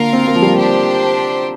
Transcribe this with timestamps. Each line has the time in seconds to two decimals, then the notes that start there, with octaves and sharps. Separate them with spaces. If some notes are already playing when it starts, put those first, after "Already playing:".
Already playing: D3 A#3 F4 A#4 F5
0.13 C4
0.27 A#3
0.35 F3
0.42 G3
0.57 D4 G4 C5